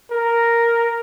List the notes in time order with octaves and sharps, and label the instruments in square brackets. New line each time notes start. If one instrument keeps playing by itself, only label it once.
[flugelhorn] A#4